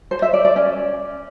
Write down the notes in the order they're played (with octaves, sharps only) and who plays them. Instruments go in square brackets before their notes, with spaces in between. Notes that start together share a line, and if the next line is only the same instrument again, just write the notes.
[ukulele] C5
E5
D5
D5
C#4